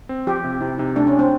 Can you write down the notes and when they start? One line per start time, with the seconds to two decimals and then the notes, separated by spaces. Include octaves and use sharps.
0.09 C4
0.27 F3 G4
0.44 C3
0.61 C3 E4
0.78 C3 D#4
0.96 A3 D4
1.07 C#4
1.13 D4
1.19 C4